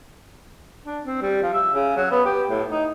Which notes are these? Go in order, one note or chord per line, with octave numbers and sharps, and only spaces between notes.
D4
C4
G3
F3
E5
C#3
F#3
B3
G4
A2
D#4